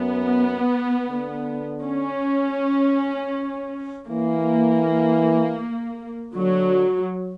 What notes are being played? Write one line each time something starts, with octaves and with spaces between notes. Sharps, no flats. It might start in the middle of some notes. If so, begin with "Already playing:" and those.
Already playing: F#2 B3
D3
C#4
E3 A#3
D3 F#3